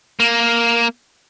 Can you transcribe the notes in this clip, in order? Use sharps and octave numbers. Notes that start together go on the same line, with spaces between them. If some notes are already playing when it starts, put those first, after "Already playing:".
A#3